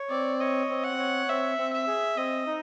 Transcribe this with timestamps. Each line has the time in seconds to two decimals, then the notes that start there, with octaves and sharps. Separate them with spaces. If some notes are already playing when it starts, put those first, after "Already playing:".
Already playing: C#5
0.10 C4 D5
0.40 C#5 D#5
0.69 C4
0.84 F#5
0.99 C#5
1.28 C4 E5
1.58 C4
1.73 E5
1.87 G#4
2.17 C4 D#5
2.47 D#4